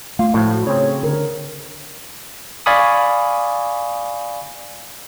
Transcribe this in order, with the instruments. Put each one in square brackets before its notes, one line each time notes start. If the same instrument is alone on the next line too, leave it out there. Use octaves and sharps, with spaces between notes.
[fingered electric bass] A3 [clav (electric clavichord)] F4 [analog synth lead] F5
[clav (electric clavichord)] A2 F3 [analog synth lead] F#4
[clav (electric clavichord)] C#3 C4 [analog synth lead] C#5
[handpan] D3 A#4
[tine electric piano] D5 F5 G#5 B5 C#6 D#6